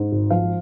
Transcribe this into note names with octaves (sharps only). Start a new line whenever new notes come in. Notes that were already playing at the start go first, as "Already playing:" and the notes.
Already playing: G#2
G#1
F3 F5